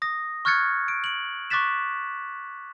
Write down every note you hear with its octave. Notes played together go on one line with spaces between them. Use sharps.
D#6 A#6
C#6 F6 F#6 G#6 A6 C#7
D7
D7 F#7
C#6 D6 F#6 A6 B6 E7